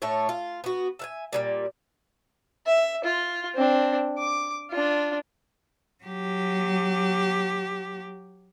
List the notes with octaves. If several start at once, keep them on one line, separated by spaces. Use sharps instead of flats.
A2 A3 C#5
F4
B3 F#4
E5 F5 G#5
A#2 F#3 G3
E5
F4
C4 D4
D6
D4 F4
F#3 G4